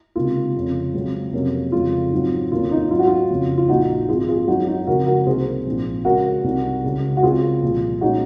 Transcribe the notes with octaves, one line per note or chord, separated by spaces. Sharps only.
C#2 C3 D#3 A#3 F4
F1 F2 C#3
C#2 C#3 F#3 C4
F2 C3 F#3 A#3 C#4
F1 F2 C#3 G#3 F4
G#2 D#3 F#3 C4
F1 D#2 D#3 A#3 C#4 F4
D#4
G#2 F#3 C#4 F4
F#4
F4
F#1 F2 C#3
F4
A#1 A#2 F3 D#4 F#4
G#1 G#2 F3 F4 G#4
F4 G#4
F#2 D#3 G#3 C#4 D#4 F#4
D#4 F#4
C#2 C#3 F3 G#3 C4 F#4 A#4
F#4 A#4
C2 C3 D#3 A#3 G#4 C5
A#1 G#2 F3 C4
C#2 C#3 G#3 F#4 A#4
C2 C3 D#3
C#2 C#3 G#3
F#4
C#2 C#3 G#3 C4 F4 G#4
C2 A#2 F3
A#2 G#3 C#4 D#4 F#4